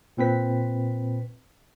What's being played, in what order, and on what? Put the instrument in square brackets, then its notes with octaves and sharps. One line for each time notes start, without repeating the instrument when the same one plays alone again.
[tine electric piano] A#2 C4 B4 B6